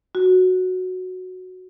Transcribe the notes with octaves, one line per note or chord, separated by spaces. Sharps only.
F#4